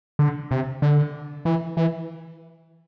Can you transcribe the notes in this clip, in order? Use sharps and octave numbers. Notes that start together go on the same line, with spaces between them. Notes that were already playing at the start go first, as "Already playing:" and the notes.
D3
C3
D3
E3
E3